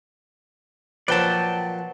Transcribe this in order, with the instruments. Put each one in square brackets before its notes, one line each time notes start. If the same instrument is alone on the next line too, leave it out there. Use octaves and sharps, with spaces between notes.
[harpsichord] A#2 F3 [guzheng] F#3 B4 [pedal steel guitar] D5 G5 A5